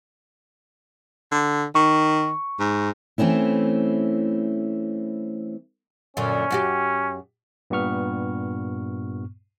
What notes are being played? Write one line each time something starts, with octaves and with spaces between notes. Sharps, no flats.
D3
D#3 C#6
G#2
E3 A3 C4 C#4 E4
F#2 A#2 D3 C#4
F#2 F#4 G4
G2 A#2 B3 C#6 F6